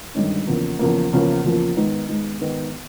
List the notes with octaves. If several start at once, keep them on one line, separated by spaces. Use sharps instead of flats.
G1 G2 D#3 G#3 C#4
E2 C#3 F3 A#3
E2 C#3 F3 A#3
E2 C#3 F3 A#3
E2 C#3 F3 A#3
G#2 D#3 G#3 B3 D#4
G#2 D#3 G#3 B3 D#4
G#2 D#3 G#3 B3 D#4